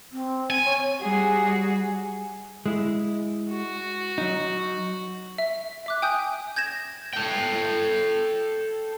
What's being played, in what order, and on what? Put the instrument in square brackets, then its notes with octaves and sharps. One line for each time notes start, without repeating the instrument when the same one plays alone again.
[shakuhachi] C4
[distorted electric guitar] G#5
[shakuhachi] C#5
[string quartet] G3 F#4 G#4
[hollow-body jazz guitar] G#3 E4
[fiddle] F#4
[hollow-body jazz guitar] F#3 D#4
[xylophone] E5
E5 D6 F#6
G5 G#5 D#6 G6
G6 G#6 A#6 E7
[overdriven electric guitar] A4 G5